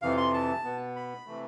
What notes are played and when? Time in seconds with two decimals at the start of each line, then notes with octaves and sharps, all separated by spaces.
0.02 F2 C3 E3 F5
0.17 C6
0.33 A5
0.64 B2 B3
0.96 B5
1.26 C3 E3 A3